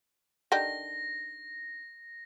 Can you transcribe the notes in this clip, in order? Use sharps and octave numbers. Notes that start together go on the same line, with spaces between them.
D3 D#3 G4 A#6